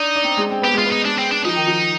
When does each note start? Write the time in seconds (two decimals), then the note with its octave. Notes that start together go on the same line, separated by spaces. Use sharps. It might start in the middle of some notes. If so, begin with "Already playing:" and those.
Already playing: D4 D#4
0.16 D4
0.24 C4
0.37 G#3
0.50 C4
0.62 B3 G4
0.73 G#3 F4
0.85 B3
0.91 D#4
1.05 G#3 D4
1.18 C4
1.31 D4
1.45 F3 D#4
1.56 D#3
1.67 F3